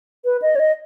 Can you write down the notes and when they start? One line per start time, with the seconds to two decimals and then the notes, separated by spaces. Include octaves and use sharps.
0.25 B4
0.42 D#5
0.56 C#5
0.59 D#5